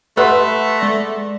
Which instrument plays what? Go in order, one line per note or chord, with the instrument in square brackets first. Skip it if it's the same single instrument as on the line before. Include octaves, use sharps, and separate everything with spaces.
[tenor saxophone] A3 [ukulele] B4 [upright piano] E5 F#5 C6
[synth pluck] G#3 D5 A#6